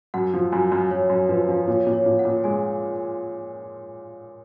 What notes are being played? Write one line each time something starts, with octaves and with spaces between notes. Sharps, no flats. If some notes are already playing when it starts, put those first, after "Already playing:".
F#2 F#5
F3
F#2 G#5
F#2
F#2 C#5
F#2
F3 B4
F3
A#2 C#5
A#2
C#5
A#2
F#5
A#2
G#3 G#5